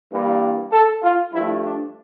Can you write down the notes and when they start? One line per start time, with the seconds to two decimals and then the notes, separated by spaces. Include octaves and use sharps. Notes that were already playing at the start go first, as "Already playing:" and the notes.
0.12 G2 E3 G3 A#3
0.72 A4
1.03 F4
1.33 G2 F3 A3 E4
1.63 D4